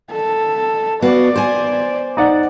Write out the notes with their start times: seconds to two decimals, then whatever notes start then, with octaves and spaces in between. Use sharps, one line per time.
0.11 A4
1.02 B3 F#4 D5 F5
1.36 C5 G#5
2.17 D#4 D5 F#5